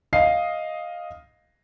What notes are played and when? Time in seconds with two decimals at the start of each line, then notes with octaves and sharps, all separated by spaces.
0.13 D#5 F5 C7